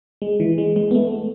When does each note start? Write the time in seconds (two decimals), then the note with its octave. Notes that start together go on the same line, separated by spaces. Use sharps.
0.22 G#3
0.40 E3
0.58 G#3
0.76 G#3
0.91 B3
0.95 A3